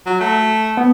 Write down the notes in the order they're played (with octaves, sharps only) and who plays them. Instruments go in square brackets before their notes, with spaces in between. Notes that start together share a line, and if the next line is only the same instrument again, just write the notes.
[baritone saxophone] F#3
A3
[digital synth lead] B3